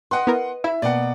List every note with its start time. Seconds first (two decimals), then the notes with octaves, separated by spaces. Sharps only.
0.11 B4 D#5 F#5 C6
0.27 B3 E4 A#4
0.64 E4 E5
0.82 B2 A#3 D5 D#5 F#5